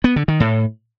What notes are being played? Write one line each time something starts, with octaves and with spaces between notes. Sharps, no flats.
B3
D3
D#3
A2